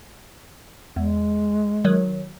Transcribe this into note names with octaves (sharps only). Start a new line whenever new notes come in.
E2 G#3
D#3 F#3